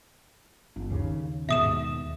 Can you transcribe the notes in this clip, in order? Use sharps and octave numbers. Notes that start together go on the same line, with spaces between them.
G1
D#2 C#3
D#2 G#2 B2 E5 D#6 E7